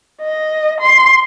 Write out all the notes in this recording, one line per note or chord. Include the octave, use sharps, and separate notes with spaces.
D#5
C6